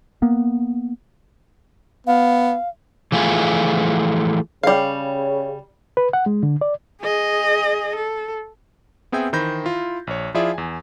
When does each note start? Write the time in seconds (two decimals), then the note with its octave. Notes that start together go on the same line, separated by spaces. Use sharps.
0.22 A#3 B3
2.07 B3 F5
3.12 E3 F3 A3 F4 G#4
4.63 C#3 G3 F5
5.97 B4
6.13 F#5
6.26 G#3
6.43 D3
6.61 D5
7.02 G#4 D#5
7.96 A4
9.12 B3 C4 G#4 E5 G5 G#5
9.33 D#3 E3 C5 B5 G6 A#6
9.64 E4 F4
10.07 A#1 C#5
10.34 F3 E4 F4 G#4 D5 E5
10.54 E2 G#5